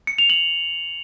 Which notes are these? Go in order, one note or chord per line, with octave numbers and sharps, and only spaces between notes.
C#7
F7
F#7